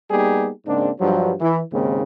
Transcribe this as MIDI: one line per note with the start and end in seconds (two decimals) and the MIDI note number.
0.10 0.49 55
0.10 0.49 58
0.10 0.49 59
0.10 0.49 63
0.10 0.49 67
0.10 0.49 68
0.66 0.89 44
0.66 0.89 49
0.66 0.89 58
0.66 0.89 60
0.66 0.89 62
1.00 1.32 43
1.00 1.32 53
1.00 1.32 54
1.40 1.60 52
1.40 1.60 64
1.72 2.03 39
1.72 2.03 44
1.72 2.03 49
1.72 2.03 58
1.72 2.03 60